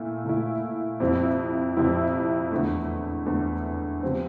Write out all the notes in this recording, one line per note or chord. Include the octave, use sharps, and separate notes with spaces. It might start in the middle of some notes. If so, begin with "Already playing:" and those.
Already playing: A#2 A3 E4
A#2 A3 E4
F2 C3 F3 C4 E4
F2 C3 F3 C4 E4
E2 D3 A3
E2 D3 A3
C3 F3 C4